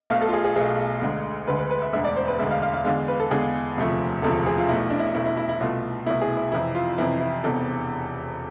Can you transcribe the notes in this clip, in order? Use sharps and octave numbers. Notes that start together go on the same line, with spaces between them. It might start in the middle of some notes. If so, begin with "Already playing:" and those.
B1 B2 A3 F5
A4
F4
G#4
G#4
B1 B2 A3 G#4
D2 D3 G#3
D2 D3 G#3 B4
B4
B4
E5
E1 D2 D3 G#3 E5
D5
C5
B4
E1 D2 D3 G#3 E5
F5
F5
F5
E2 D3 G#3 F5
B4
A4
E2 D3 G#3 G#4
E1 D2 C3 F3 A3
E1 D2 C3 F3 A3 A4
G#4
F4
B1 B2 A3 E4
D4
E4
B1 B2 A3 E4
E4
E4
E4
C2 B2 A3 F4
C2 B2 A3 E4
G#4
E4
F2 C3 E3 E4
F4
F2 C3 E3 E4
E4
E1 E2 C3 A4